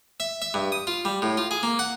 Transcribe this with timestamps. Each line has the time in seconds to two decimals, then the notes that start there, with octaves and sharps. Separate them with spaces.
0.20 E5
0.42 E5
0.54 G2
0.72 D#6
0.87 F4
1.05 G3
1.22 A2
1.37 F4
1.51 G#4
1.63 A#3
1.79 F#5